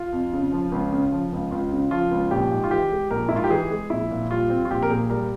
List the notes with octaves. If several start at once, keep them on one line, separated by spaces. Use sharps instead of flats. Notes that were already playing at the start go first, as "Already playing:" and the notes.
Already playing: F4
F2
C#3
F3
C#2
C#3
F3
C#2
C#2 F4
C#3
F3 F4
C#2
A#1 G4
G#2
F4
E3 G4
G#3
A#1 A#4
E4
G#2 F4
G4
E3 G#4
G#3
A#1 E4
A#2
G3 F4
C4
F4
A#1 G4
A#4
A#2 G#4
G3 A#4